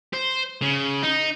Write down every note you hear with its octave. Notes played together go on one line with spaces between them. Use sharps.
C5
C#3
D#4